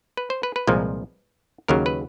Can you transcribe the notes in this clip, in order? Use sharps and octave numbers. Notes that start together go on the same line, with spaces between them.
B4
C5
B4
B4
C2 A#2 F3 G#3
D#2 C#3 F#3 A#4
B4